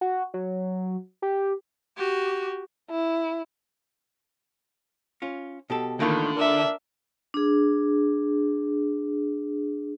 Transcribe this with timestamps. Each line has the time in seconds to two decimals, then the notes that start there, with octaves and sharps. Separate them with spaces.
0.01 F#4
0.34 F#3
1.22 G4
1.97 F#4 G4
2.90 E4
5.22 C#4 F4
5.70 B2 G4 A4
6.00 E2 A2 D3 D#3 A#3 F4
6.37 D4 A#4 E5
7.34 D4 G#4